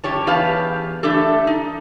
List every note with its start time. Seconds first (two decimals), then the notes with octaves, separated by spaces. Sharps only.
0.04 F#2 G4 C#5 A5
0.27 E2 G4 B4 F5 A5
1.03 E3 A3 D4 G4 A4
1.47 D#4